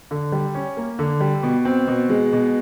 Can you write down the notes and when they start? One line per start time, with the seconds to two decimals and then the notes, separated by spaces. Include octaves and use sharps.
0.11 D3
0.32 G3
0.55 C#4
0.77 A#3
0.99 D3
1.21 G3
1.43 B2
1.65 C4
1.88 B2
2.10 G#3
2.33 B2